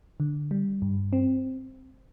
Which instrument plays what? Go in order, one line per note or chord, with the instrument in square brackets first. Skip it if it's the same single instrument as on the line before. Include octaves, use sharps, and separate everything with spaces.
[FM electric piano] D3
G3
G2
C4